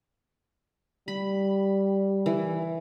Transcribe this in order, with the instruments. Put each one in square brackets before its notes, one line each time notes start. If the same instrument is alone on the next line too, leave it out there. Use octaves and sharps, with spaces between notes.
[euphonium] G3 [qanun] B5
[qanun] E3